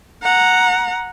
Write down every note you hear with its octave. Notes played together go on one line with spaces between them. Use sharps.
F#5 A#5